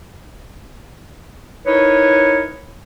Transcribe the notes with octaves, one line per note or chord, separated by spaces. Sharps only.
D#4 E4 A#4 B4 C#5